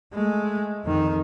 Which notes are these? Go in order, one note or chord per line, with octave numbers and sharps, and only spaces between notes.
G#3 A3
F2 D#3